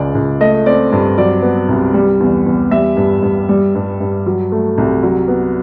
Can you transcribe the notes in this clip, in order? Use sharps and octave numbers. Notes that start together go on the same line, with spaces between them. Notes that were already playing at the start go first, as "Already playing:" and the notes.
Already playing: C#2 G#3 D5
C#2
A3 D#5
C4 D5
G2
F#3 D5
B3
C2
G3
E2
E2
G3 E5
G2
G2
G3
G2
G2
F#3
A3
C2
F#3
B3